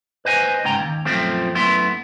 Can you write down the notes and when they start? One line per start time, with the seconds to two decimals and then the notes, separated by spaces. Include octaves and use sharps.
0.25 B4 C5 D#5 G5 G#5
0.64 G#2 C#3 G5 A#5
0.79 D#2
1.05 F#2 A#2 F3 A3 C4
1.55 F#2 A3 B3 E4 C6